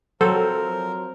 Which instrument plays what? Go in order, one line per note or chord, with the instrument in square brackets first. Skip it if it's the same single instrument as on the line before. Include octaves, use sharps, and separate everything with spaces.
[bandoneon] F3 A#4 A#5 [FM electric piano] F#3 C5 [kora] C4 [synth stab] A4